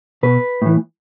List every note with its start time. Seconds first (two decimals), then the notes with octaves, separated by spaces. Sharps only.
0.23 B2 B4
0.62 A2 E3